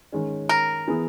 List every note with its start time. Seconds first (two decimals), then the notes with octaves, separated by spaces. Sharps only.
0.12 D#3 G#3 C#4
0.49 A#4
0.87 E3 B3 E4 G#4